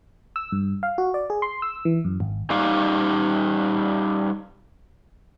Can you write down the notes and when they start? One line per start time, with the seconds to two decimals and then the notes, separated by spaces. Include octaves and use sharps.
0.36 E6
0.52 G2
0.83 F5
0.98 F#4
1.14 D5
1.30 G#4
1.42 C6
1.62 E6
1.85 E3
2.05 F#2
2.20 G#1
2.50 G3 D#4 G4 F5